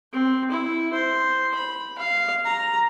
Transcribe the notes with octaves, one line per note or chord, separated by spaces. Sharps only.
C4
E4
C5
B5
F5
A#5